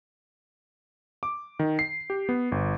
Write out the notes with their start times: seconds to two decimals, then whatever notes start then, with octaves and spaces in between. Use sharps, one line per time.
1.23 D6
1.59 D#3
1.79 C7
2.10 G4
2.29 B3
2.52 G1